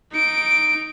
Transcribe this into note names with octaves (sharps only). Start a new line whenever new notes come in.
D#4 D7